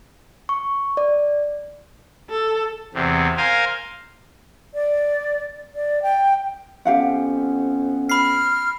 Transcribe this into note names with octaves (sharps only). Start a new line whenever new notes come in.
C#6
D5
A4
E2 C3
A#4 C5 F5 G#5
D5
D5
G5
F2 B3 C#4 G4 F5 F#5
B5 F6 C7